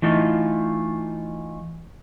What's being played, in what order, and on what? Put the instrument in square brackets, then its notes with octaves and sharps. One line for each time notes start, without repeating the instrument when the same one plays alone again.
[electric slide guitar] E3 A3 D#4 F4